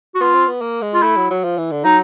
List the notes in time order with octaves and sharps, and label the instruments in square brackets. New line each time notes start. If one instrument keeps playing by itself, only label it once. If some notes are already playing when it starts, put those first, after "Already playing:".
[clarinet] F#4
[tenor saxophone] B3 [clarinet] F4
[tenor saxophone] C4
B3
A#3
G#3
[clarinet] F4
[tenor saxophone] A3 [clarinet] E4
[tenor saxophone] F#3
F#3
F3
E3
D3
[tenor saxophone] F#3 [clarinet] D#4